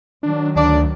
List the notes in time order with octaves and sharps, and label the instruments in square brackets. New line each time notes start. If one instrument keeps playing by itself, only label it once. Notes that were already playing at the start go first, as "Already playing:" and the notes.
[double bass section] D#3 F#3 [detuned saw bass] D4
[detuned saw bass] D2 [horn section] D4 D5